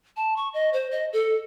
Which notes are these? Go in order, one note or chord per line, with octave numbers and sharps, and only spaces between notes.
A5
C#6
D#5
C5
D#5
A4